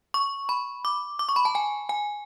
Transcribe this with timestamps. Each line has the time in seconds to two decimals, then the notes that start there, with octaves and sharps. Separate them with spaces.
0.14 C#6
0.49 B5
0.85 D6
1.19 D6
1.29 C#6
1.36 B5
1.45 A5
1.55 G#5
1.89 G#5